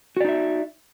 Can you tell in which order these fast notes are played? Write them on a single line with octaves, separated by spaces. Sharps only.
F#4 D5 D#4 E5